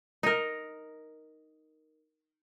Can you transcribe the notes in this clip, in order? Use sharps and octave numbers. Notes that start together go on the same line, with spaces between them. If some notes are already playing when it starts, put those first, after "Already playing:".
D#4 A#4